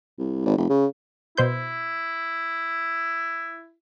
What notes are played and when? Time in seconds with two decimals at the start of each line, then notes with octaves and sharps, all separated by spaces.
0.19 C2
0.45 G#1
0.57 F1
0.69 C#3
1.38 B2 E4 C5 G6